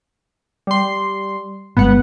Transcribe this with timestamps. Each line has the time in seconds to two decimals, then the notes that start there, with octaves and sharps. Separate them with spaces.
0.67 G3 C6
1.77 G1 G#3 B3 F#5